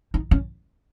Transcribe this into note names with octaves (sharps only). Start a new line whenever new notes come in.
D#4
C#4